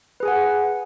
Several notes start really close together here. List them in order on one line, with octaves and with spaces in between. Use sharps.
B4 G#4 G#5 F#5